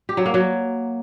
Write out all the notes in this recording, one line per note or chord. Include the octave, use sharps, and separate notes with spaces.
G4
F#3
A#3
F#3